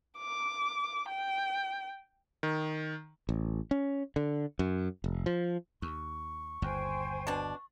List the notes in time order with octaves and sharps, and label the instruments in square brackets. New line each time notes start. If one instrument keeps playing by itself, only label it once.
[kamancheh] D6
G5
[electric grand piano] D#3
[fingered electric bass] A1
C#4
D3
F#2
F1
F3
[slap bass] D#2 [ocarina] C#6
[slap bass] G1 D#2 [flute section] C5 G5 G#5
[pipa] B2 D4